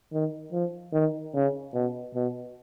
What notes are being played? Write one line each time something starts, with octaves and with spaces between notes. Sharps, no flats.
D#3
F3
D#3
C#3
B2
B2